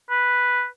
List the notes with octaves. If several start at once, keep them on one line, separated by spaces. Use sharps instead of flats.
B4